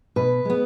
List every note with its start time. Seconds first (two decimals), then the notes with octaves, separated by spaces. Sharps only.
0.16 B2 B4
0.45 G#3 B3